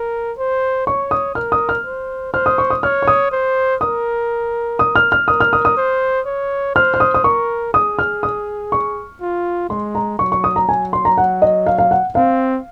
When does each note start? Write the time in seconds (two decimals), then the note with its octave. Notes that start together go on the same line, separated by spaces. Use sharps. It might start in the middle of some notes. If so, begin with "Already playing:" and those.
Already playing: A#4
0.38 C5
0.87 C#5 C#6
1.11 D#6
1.35 A#4 F6
1.52 D#6
1.69 F6
1.85 C5
2.33 C5 F6
2.46 D#6
2.58 C#6
2.70 D#6
2.83 C#5 F6
3.02 C#6
3.08 D#6
3.31 C5
3.81 A#4 D#6
4.79 D#6
4.96 F6
5.12 F6
5.28 A#4 D#6
5.40 F6
5.53 D#6
5.65 D#6
5.77 C5
6.26 C#5
6.75 C5 F6
6.94 F6
7.00 D#6
7.14 D#6
7.24 A#4 C#6
7.73 G#4 D#6
7.99 F6
8.23 D#6
8.72 C#6
9.21 F4
9.69 G#3 C6
9.95 A#5
10.19 F#3 C#6
10.32 C#6
10.44 D#6
10.56 A#5
10.68 F#3 G#5
10.93 C6
11.05 A#5
11.18 F#5
11.42 D#5
11.66 F5
11.78 F5
11.91 F#5
12.15 C4 F5